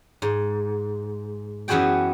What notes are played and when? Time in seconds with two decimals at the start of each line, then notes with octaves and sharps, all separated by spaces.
0.22 G#2
1.68 F#2 E3 B3 F#4 G#4 G5